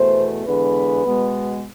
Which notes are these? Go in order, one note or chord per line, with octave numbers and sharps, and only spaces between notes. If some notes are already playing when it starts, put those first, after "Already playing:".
Already playing: E2 B2 A3 C5
E2 D3 G#3 B4
B2 G#3 B3